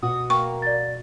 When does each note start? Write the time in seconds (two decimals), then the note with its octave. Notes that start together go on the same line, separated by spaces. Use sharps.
0.02 B2 F#4 D#6
0.30 A#3 G5 C#6
0.62 D5 A6